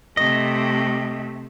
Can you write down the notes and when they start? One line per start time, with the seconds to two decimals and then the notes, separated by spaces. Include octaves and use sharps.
0.17 C3 A3 D#5